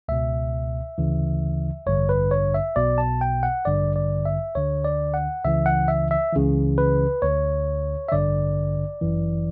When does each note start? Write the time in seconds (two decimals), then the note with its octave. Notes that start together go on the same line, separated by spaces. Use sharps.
0.08 C#2 B2 E5
0.98 D2 C#3 E3
1.86 A1 G2 D3 C#5
2.09 B4
2.31 C#5
2.54 E5
2.76 B1 B2 D5
2.98 A5
3.21 G5
3.43 F#5
3.65 A1 G2 D3 D5
3.96 D5
4.25 E5
4.55 D2 D3 C#5
4.85 D5
5.14 F#5
5.45 C#2 C#3 E3 E5
5.66 F#5
5.88 E5
6.11 E5
6.33 C#2 C#3 E3
6.78 B4
7.22 D2 D3 C#5
8.09 E5
8.12 A1 G2 D3 D5
9.01 G1 F#2 E3